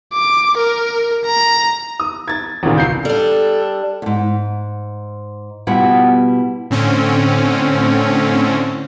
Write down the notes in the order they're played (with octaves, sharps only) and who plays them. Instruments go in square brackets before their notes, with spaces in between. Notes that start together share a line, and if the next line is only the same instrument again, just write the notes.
[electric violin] D6
A#4
A#5
[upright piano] D#6
G#6 A6
G#1 E2 A#2 C#3
C#2 G6 C7
[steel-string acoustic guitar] G3 D4 [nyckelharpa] A4
[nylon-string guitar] E2 G#2
B2 G3 B3 E4 F4 F#5
[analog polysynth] A2 D3 C4 C#4